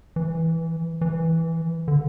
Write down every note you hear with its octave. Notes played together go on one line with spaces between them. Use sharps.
E3
E3
D3